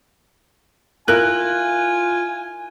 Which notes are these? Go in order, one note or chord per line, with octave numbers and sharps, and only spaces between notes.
E4 F4 A#4 G#5 F#6